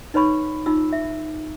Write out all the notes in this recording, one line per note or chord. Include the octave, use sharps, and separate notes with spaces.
D#4 B4 C#5 B5 C#6
D#4 F4 E6
E5